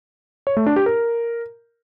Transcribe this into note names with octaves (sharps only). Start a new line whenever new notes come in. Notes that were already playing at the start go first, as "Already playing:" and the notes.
C#5
A3
D4
G4
A#4